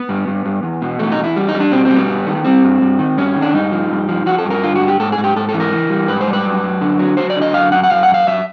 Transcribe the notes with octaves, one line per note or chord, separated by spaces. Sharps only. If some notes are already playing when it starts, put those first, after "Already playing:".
Already playing: B3
G2
G2
G2
E2
B2
E2 A3
D#4
E2
E4
G3
D#4
G3
D4
B2 C4
G3 C4
B3
G2
D#3
G3 C4
G2
G2
D#3
G2 C#4
D#3
D4
G2 D#4
F3
G2
F3
F3 F#4
A4
G2 A#4
D3 F4
F#4
G2
G4
G#2 A4
G#4
G#2
G4
G#2 A4
E3 A4
A#4
E3
G3
G#2 B4
C5
G3
B4
F#2
F#2
D3
F#3
F#3 C5
D5
D3
D#5
F#2 F5
F#2 F#5
F#5
F#2 F5
F#2 F#5
F5
F#2 E5